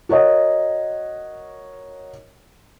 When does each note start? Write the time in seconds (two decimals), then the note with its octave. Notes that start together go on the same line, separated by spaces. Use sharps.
0.09 F#4 A#4 C#5 D#5 F#5